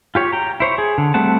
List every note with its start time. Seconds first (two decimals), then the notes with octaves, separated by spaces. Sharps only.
0.15 F4 G4 C#5
0.32 G5 A#5
0.60 E4 C5 C#5
0.78 G#4
0.98 D3
1.14 G3 A3 C4 F#5 A5